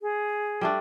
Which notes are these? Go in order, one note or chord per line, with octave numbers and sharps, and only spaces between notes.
G#4
G3 A3 D4